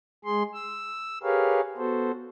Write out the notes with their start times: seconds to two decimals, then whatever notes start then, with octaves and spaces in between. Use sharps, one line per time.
0.25 G#3 G#4 C6
0.54 E6
1.23 G4 G#4 A#4 B4 C#5 F5
1.77 B3 F#4 A4 C5